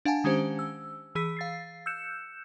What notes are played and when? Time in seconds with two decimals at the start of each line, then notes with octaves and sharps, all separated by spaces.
0.05 D4 F5 F#5 G#5 A5
0.24 D#3 G#3 C#4 G4 C5
0.59 E6
1.15 E3 G#4 E6 B6
1.37 F5 A6 C7
1.86 E6 F#6 G6 C#7 E7